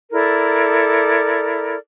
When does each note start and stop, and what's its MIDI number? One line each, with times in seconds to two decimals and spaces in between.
0.11 1.76 64
0.11 1.76 69
0.11 1.76 70
0.11 1.76 74